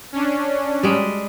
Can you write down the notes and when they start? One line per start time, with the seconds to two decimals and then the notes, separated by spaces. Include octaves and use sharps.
0.13 C#4 D4
0.83 G3 G#3